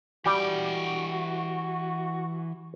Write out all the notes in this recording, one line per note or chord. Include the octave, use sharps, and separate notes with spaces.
E3 G3 F#4 G4 G5